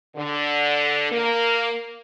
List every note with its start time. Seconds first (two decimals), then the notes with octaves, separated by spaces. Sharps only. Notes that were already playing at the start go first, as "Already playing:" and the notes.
0.16 D3
1.12 A#3